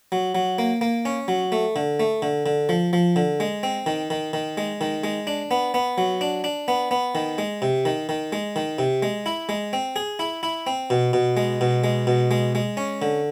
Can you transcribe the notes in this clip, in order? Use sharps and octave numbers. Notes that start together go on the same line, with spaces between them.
F#3
F#3
A#3
A#3
C#4
F#3
A3
D3
A3
D3
D3
F3
F3
D3
G#3
C4
D#3
D#3
D#3
G#3
D#3
G#3
D4
B3
B3
F#3
D4
D4
B3
B3
D#3
G#3
C3
D#3
D#3
G#3
D#3
C3
G#3
E4
G#3
C4
G#4
E4
E4
C4
B2
B2
G#3
B2
G#3
B2
G#3
G#3
C#4
D3